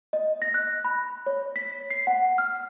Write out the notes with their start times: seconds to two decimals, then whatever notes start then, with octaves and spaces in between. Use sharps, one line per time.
0.13 D#5
0.42 A#6
0.54 F#6
0.85 B5
1.26 C#5
1.56 B6
1.91 C7
2.07 F#5
2.38 F6